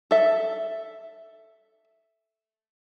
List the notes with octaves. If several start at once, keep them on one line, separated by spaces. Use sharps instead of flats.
A4 E5